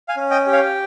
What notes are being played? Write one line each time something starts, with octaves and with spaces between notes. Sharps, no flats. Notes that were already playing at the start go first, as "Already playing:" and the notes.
F5 G#5
C#4
D#5 G5
G4
C#5 F5